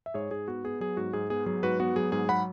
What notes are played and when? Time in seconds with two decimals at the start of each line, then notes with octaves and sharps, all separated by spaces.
0.06 E5
0.14 G#2 G#4 C#5
0.31 G#2 G#4
0.48 B3 F#4
0.64 B3 G#4
0.80 F#3 G#4
0.97 G#2 F#4
1.13 G#2 G#4
1.30 B3 G#4
1.46 F#3 G#4
1.63 G#2 F#4 B4
1.80 B3 F#4
1.96 F#3 G#4
2.12 G#2 G#4
2.29 F#3 F#5 B5